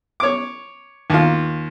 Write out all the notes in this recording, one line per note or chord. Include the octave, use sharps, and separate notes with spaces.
C#5 D6
D#2 F4